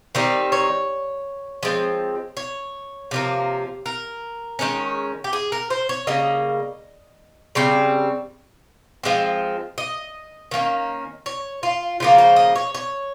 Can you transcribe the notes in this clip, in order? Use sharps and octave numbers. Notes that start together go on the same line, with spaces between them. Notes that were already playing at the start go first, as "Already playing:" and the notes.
D#3 G3 C4 D#4
C#5
F3 G#3 C4
C#5
C3 F3 A#3
A#4
D#3 G#3 C#4
G4
G#4
A#4
C5
C#5
C#3 G3 A#3 D#5
C#3 G3 C4
F3 G#3 C4
D#5
D#3 A#3 C#4
C#5
F4
C#3 F3 A#3 F4
C5
D#5
C#5
C#5